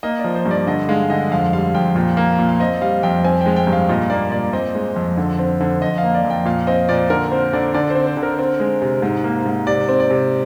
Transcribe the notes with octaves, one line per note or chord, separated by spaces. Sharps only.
A#3 D#5
D5
F3
C5
G2
D5
D3 D#5
G#3 F5
D3 D#5
F2 F5
G3 F5
F2 G5
A#2 G5
A#3
A#2
F5
C4 D#5
G3 F5
F2 G5
C4 G#5
G#3 G5
G5
G2
F5
A#2 D#5
A#3 D5
A#2 D5
C4 D#5
G#3
F2
D3
C4
D3
F2 D#5
F5
A#3
D5
F2
G5
A#2 F5
C4 D#5
A#2 D5
D3 A#4
C4 C5
D3 D5
D3 D5
C5
C4
C5
D3
A#4
C4
G#3
C3
G#2 C5
A#3
G#2
C3 D5
C4
D5
C3